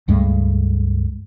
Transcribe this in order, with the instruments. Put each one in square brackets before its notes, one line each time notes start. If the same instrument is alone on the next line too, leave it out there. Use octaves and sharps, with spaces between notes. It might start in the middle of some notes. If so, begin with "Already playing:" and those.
[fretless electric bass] C#2 G2 G#3 A3